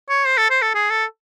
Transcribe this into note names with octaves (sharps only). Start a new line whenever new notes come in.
C#5
C5
A4
C5
A4
G#4
A4